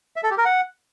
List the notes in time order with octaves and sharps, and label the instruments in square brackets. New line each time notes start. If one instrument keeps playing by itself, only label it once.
[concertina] E5
A4
G4
A#4
F#5